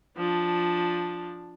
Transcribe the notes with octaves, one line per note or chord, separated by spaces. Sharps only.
F3 D4